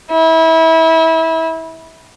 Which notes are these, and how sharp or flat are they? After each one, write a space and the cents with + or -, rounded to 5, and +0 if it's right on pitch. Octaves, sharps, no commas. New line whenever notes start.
E4 -25